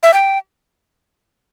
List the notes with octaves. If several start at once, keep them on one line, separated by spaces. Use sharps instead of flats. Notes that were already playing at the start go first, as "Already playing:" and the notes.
E5
G5